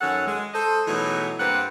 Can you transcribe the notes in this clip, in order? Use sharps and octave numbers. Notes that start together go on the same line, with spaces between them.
F#2 D#3 C#4 A4 F#5
G#3
A4 C5 D#5
B2 E3 F#3 G#3 A3 D#4
G2 A#3 C4 F4 B4 F#5